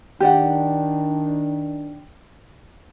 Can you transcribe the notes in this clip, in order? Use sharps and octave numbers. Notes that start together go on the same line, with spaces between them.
D#3 D4 G4 D5 F#5